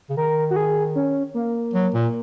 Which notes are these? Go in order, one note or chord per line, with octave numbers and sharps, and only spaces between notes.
C#3
D#3 A#4
F#4
G#4
C#4
A#3
F#3
A#2